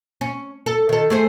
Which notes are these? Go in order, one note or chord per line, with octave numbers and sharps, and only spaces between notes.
C#4
A4
D#3 A4
A3 G#4 C5